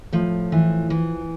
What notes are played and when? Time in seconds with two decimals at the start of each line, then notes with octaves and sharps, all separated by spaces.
0.13 A2 F3
0.52 E3
0.90 E3